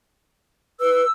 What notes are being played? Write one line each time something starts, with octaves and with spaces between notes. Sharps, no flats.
B4 E6